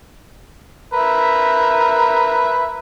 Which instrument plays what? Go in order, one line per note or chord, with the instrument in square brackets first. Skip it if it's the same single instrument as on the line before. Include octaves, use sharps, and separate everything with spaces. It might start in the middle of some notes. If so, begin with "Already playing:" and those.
[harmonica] A#4 B4 E5